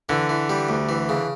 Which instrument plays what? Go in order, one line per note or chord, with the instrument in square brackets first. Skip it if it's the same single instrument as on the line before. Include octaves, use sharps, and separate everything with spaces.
[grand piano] D3 [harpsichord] E3
[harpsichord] E3
G3
D2
E3
C#3